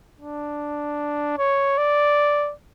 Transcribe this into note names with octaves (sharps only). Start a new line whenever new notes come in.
D4
C#5
D5